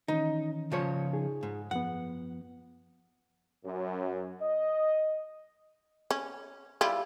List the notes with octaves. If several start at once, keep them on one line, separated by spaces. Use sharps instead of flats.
D#3 E3 C#4 D#4
C#3 F3 C#5
D#4 G#4
G#2
F#2 F3 B3 F#5
F#2
D#5
C#4
G3 E4 F4